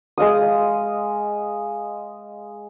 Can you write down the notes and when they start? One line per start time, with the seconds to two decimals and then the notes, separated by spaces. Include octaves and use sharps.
0.18 G#3 D#5 F5 D#6